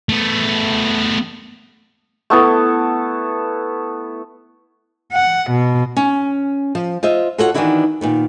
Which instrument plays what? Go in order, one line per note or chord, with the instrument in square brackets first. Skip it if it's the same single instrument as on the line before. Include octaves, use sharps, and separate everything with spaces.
[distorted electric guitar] A3 B3
[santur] A3 B3 E4 A4
[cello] F#5
B2
[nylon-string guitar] C#4
F3
F4 C5 D#5 E5
F4 F#4 A4 C#5 F#5
D#3 E3 B3 D4 E4 F#4
A#2 D#3 B3